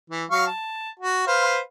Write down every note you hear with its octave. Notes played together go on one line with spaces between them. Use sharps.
E3
F#3 F5 C#6
A5
F#4
B4 C5 F5